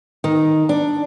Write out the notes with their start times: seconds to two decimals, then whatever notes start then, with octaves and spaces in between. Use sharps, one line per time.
0.24 D#3
0.69 D4